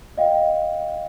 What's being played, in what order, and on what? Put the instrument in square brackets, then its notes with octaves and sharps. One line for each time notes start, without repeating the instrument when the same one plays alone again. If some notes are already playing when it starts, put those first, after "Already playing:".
[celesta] D#5 F5 G5